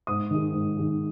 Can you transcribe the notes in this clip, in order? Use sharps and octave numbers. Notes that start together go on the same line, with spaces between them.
G#2 D#6
D#3 G#3
G#2
D#3 G#3